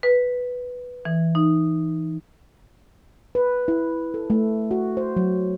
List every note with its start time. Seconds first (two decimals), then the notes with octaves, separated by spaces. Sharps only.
0.03 B4
1.05 E3
1.35 D#4
3.35 B4
3.68 E4
4.14 A4
4.30 A3
4.71 F#4
4.97 C5
5.16 F#3